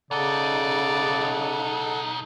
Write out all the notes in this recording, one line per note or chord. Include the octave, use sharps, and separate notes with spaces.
B1 C#3 D#4 A4 D5 F#5